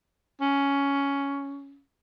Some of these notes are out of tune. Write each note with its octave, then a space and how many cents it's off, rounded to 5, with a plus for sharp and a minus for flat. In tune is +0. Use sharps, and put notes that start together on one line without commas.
C#4 +10